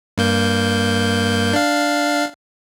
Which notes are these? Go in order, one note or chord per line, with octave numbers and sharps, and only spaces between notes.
G2 A#3 G6
D4 F5